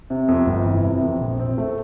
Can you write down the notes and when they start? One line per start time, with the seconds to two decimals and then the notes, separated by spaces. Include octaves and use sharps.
0.10 C3
0.28 F2
0.47 G1
0.65 E3
0.83 C3
1.01 F2
1.20 A#1
1.39 C4
1.58 A3